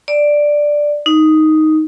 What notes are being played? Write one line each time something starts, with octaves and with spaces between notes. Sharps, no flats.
D5
D#4